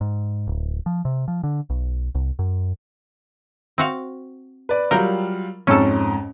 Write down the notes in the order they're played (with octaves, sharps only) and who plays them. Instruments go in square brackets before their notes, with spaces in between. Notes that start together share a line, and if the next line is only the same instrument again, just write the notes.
[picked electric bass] G#2
D1
F3
C3
F3
D3
B1
C2
F#2
[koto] C4 F#4 F5
[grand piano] B4 D5
[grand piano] F#3 G3 F4 [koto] A#4 G5
[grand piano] F2 G#2 [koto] C#4 A4